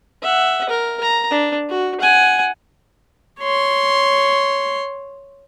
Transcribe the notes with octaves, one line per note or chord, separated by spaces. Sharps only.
E5 F#5
A#4
A#5
D4
F#4
F#5 G#5
C#5 C6